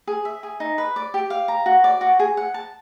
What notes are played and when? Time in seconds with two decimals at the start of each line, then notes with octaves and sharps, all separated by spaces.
0.07 G#4
0.25 E5
0.43 G#4
0.60 D#4
0.78 B4
0.96 D5
1.14 G4
1.30 F5
1.48 A#5
1.66 F#4
1.84 D5
2.01 F#4
2.19 G#4
2.37 F#5
2.54 A5